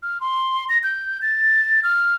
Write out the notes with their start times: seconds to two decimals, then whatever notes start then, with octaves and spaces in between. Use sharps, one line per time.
0.03 F6
0.21 C6
0.69 A#6
0.83 G6
1.22 A6
1.83 F6